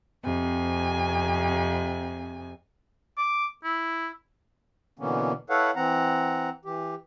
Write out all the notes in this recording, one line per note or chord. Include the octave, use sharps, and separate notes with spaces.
F2 C3 G#5
D6
E4
B2 D3 E3 A#3 B3 C#4
E4 A4 B4 C#5 F5 F#5
E3 C4 F#5 A#5
E3 G4